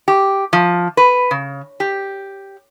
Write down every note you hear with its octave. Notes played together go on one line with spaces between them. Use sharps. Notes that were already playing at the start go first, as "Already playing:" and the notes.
G4
F3
B4
C#3
G4